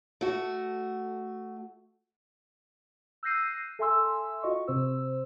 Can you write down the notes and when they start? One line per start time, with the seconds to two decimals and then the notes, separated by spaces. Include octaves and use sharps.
0.21 A3 F#4
3.23 E6 F#6 G6 A#6 C7 D#7
3.79 A4 E5 G#5 C6 E6
4.43 F4 F#4 D#5 C#6
4.68 C3 C4 C5 E6